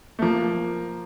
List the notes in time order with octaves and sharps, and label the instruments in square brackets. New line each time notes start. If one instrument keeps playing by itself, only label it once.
[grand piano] A3
[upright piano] F3 [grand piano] A#3